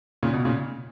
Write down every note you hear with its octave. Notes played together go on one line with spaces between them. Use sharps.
A#2 C#3
B2
A#2 C#3